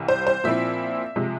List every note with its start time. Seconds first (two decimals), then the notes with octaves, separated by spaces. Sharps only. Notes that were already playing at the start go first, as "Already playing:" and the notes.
Already playing: C2 C3 E3
0.08 C5
0.27 C5
0.44 A#2 F3 C4 E4 E5
1.16 C3 F3 G#3